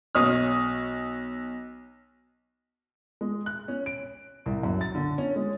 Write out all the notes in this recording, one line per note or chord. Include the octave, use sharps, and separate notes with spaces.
B1 C#5 D#6 F6
G#3
F#6
C#4
D7
C2
F#2
A6
D3
C#4
G#3